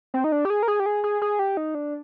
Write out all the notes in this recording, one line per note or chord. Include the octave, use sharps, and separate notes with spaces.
C4
D#4
D4
G4
G#4
A#4
G#4
G4
G#4
G#4
G#4
G4
D#4
D4